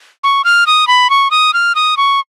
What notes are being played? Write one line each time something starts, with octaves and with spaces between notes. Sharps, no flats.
C#6
F6
D#6
B5
C#6
D#6
F6
D#6
C#6